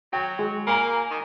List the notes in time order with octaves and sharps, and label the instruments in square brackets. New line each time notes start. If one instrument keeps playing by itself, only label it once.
[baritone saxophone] F#3 [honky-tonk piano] G5
[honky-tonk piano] G#3
[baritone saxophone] A#3 [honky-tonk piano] G#5 A#5
[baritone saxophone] D#3